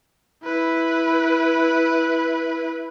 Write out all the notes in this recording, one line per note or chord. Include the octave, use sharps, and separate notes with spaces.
E4 B4